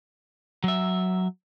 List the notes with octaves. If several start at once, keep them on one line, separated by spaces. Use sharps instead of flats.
F#3 E5